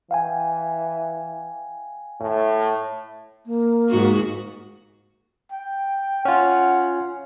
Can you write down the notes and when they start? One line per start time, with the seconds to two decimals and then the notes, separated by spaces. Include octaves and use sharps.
0.11 E3 F5 G5 G#5
2.20 A2
3.46 A#3
3.90 G#2 F#4
5.52 G5
6.25 C#4 F4 F#5